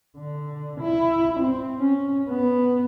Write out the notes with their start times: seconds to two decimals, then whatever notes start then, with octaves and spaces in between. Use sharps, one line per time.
0.17 D3
0.81 E4
1.40 C4
1.79 C#4
2.29 B3